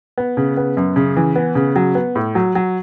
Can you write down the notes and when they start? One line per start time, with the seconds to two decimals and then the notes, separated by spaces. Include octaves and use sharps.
0.18 B3
0.37 C#3
0.57 B3
0.77 F#2
0.96 C#3
1.16 E3
1.36 B3
1.55 C#3
1.76 F#3
1.95 B3
2.15 A2
2.35 F#3
2.55 F#3